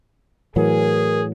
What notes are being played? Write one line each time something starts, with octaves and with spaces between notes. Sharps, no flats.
A2 E3 F#3 G#4 A#4